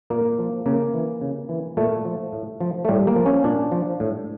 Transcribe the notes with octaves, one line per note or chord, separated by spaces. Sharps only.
A#2 A#3
F3
C#3 A#3
E3
C#3
E3
A#2 A3
F3
A2
F3
A3
A2 G3
A#3
F3
C#4
A#2 D4
F3
A2